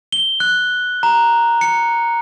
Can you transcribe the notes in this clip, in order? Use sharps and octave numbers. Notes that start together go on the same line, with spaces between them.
G7
F#6
A#5
C#7